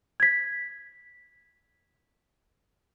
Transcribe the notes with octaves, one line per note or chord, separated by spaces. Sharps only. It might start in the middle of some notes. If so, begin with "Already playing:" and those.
G#6 B6